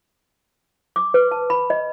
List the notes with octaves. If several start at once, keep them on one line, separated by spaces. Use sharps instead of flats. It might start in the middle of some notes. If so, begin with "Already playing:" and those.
D6
B4
A5
B5
D#5